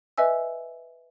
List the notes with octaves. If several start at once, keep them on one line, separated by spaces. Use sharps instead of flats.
B4 D#5 E5 G#5 E6